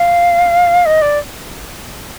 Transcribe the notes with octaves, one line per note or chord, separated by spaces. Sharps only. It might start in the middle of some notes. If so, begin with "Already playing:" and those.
Already playing: F5
D#5
D5